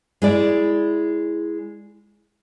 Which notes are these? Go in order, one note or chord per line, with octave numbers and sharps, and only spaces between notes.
G#3 E4 D5